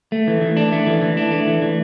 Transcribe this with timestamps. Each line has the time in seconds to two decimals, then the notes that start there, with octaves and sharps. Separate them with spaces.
0.12 A3
0.28 E3
0.42 E3
0.57 D4
0.72 A3
0.87 E3
1.02 E3
1.17 D4
1.31 A3
1.47 E3
1.62 E3